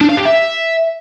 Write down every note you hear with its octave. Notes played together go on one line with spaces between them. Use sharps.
D4
F5
G4
E5